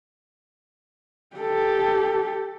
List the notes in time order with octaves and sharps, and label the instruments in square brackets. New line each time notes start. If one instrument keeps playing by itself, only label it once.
[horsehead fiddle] G4 A4